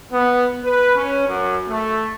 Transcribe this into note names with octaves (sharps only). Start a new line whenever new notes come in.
B3
B4
C#4
F#2
A3